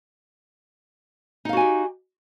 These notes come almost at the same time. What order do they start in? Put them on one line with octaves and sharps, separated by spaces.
D#4 F5 F#4 G#5 G4